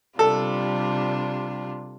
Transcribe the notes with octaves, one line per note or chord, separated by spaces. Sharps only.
C3 G3 D4 F4 A4